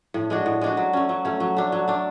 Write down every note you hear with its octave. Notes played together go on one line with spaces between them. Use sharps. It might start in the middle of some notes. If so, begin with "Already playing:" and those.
A2
G#3 D4 F#4
A2
G#3 D4 F#4
F#3
A3 C#4
F#3
A3 C#4
F#3
A3 D4
F#3
A3 D4